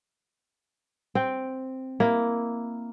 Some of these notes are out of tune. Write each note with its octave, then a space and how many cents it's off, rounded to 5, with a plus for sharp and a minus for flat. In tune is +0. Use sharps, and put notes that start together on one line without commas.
C4 +0 G5 +0
A#3 +0 E4 +0